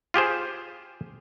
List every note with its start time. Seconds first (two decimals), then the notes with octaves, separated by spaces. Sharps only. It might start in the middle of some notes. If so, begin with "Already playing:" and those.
0.14 F4 G4 G#4 C5